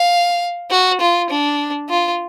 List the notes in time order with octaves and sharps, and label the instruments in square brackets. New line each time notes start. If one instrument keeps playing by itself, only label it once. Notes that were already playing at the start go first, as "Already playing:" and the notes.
Already playing: [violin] F5
F#4
F4
D4
F4